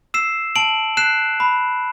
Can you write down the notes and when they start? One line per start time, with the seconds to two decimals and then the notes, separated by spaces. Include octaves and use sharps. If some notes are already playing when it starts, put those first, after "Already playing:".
0.14 E6 C7 E7
0.56 A5 D7 F#7
0.97 F#6 C7 E7
1.40 B5